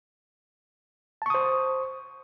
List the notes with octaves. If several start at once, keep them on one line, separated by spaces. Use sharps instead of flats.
C5 A5 C#6 D#6